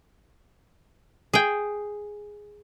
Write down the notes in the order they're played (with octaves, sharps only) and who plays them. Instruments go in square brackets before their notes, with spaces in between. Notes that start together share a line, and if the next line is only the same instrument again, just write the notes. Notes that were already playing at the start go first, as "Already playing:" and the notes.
[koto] G#4 G5